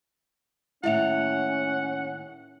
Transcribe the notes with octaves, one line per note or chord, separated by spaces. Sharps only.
D#2 A2 C#4 E4 E5 F#5 F7